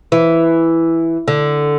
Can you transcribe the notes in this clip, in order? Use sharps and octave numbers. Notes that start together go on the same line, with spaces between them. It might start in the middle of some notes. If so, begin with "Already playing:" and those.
E3
D3